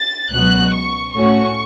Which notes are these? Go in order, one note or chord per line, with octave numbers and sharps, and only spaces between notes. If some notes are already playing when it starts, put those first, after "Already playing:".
Already playing: A6
C#2 B2 F#3 B3 F#4 F#6
C#6
A2 A3 C#4 F#4 C#6